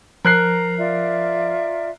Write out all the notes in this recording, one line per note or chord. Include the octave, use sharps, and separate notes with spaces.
F3 A#4 A#5 F#6 C7
F4 D5 E5